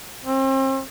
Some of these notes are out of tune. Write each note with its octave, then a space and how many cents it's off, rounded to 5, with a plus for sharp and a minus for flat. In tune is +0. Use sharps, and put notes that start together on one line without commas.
C4 +40